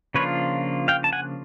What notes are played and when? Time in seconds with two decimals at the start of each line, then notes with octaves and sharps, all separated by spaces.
0.14 C#3 F3 A#3 D4 F4 B4 C#5
0.88 F5 G5
1.04 A5
1.13 F#5 G#5